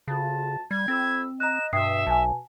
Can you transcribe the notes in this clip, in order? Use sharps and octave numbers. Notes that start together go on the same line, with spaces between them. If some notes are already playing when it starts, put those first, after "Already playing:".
D2 C#3 F4 A5
G3 G#6
F2 C4 B5 E6
D#5 A#5 F#6 E7
G2 B2 E5 G5 D#6 C7
B1 G#5 A5